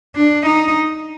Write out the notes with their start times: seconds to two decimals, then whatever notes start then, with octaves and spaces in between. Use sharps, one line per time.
0.16 D4
0.46 D#4